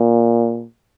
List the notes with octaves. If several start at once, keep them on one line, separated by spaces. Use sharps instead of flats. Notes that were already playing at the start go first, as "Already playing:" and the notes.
Already playing: A#2